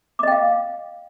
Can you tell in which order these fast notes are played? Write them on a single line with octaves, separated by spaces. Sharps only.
D6 D#5 G5 F5